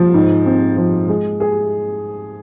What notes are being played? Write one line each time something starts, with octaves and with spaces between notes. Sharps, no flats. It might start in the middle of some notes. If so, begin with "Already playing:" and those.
Already playing: F3
G#2
C4
F3
G#3
G#4